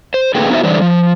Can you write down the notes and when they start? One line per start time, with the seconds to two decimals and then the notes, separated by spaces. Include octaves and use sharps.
0.14 C5
0.35 A2 D3 A#3 G#4 B4 G5
0.50 B3 D#4 E4 F#4 C5 E5
0.63 D3 E3 G3 C5 D5
0.82 F3